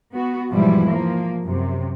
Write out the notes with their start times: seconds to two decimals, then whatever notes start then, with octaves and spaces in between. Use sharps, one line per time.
0.13 B3 F#4
0.51 E2 G#2 B2 F3 G3 E4
0.89 F3 A#3
1.46 F#2 C3